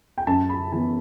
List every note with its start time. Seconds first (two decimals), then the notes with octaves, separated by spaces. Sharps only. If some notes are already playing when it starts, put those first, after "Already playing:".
0.18 G5
0.27 F#2 A5
0.49 B5
0.72 E3 B3 A5